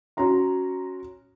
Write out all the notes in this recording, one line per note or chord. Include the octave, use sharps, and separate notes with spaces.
C#4 F#4 C#5 A#5 C6